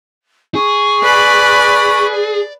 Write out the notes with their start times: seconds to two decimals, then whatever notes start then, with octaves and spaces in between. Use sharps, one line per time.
0.55 G#4 C#6
1.03 B4 D5 B5
2.11 D5